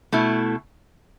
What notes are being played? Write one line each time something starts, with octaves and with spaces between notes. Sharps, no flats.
B2 A3 E4